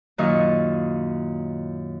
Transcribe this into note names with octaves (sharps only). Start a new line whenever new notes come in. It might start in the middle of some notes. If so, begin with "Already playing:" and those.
F#2 A#2 D#3 D#4 C#6